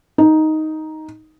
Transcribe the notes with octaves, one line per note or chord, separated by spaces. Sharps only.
D#4